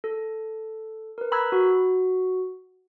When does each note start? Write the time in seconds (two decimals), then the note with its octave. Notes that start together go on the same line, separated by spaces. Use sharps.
0.04 A4
1.18 A#4 B4
1.32 A#5 B5 E6 F#6 G#6
1.52 F#4